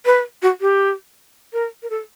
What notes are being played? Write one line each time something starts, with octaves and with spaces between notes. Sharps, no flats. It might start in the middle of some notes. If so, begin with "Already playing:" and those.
B4
F#4
G4
A#4
A#4
A4